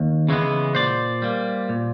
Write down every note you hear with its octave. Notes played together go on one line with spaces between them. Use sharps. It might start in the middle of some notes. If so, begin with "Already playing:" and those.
Already playing: D#2
C#3 E3 G#3 B3
A#2 C5 D5
G3 A#3
A#2